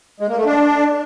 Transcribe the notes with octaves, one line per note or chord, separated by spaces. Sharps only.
G#3
A#3
A3
D4